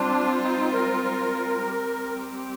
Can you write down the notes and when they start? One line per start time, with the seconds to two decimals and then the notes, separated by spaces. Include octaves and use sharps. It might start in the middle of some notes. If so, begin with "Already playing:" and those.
Already playing: G3 C4 D4 F4 C5
0.42 D#4
0.73 A#4
1.03 A#4
1.65 G3 C4 G4